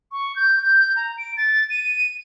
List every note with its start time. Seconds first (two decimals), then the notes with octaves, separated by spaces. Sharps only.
0.12 C#6
0.36 G6
0.62 G6
0.96 A#5
1.18 D7
1.37 A6
1.70 D#7